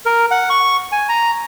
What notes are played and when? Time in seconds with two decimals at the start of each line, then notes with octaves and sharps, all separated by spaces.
0.06 A#4
0.31 F#5
0.50 C#6
0.92 G#5
1.09 A#5